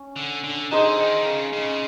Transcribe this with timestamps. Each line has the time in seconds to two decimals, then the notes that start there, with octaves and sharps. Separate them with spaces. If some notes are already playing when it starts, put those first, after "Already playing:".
Already playing: C#4
0.16 D3
0.44 D3
0.71 D3 D#4 G#4 C5 D#5
0.98 D#3
1.26 C#3
1.53 C#3